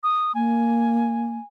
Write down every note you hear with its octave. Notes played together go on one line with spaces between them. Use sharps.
D#6
A#3 G#5